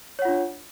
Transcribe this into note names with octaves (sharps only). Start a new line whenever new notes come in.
D4 F4 C#5 F#5